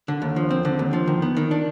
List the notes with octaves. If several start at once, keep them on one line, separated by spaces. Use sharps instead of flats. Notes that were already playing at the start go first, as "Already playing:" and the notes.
D3
D#2
F3
C4
D3
D#2
F3
D#3
B3
D#3
D4